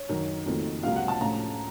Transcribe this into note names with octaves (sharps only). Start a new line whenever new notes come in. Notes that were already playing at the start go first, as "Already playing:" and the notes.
Already playing: C#5
F#2 D#3 F#3
F#1 F2 D#3 F#3 A3
C#2 C3 F#3 A#3 F4 F5
F#5
A5
A2 F3 A3 C#4 F4 A#5